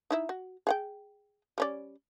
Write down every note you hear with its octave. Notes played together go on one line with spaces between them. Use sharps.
D#4 E4 E5
F#4
G#4 F#5 G5
G3 C#4 D5